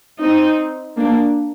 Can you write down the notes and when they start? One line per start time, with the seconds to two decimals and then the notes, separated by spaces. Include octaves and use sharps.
0.22 C4 D#4
0.98 A#3 D4